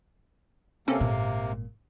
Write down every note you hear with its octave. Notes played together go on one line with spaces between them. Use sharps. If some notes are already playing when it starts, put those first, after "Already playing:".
C3 A#3 C4 C#4 A4
G#1 A#2